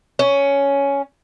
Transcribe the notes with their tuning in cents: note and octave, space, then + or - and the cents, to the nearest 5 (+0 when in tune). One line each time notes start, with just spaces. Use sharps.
C#4 +10